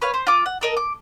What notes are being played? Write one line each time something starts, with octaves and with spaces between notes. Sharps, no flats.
B4 C#5 F5
C5
F4 D6
F#5
A4 A#4 D#5
D6